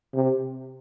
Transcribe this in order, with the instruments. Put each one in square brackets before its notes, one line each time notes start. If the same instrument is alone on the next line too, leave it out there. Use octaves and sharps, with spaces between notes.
[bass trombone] C3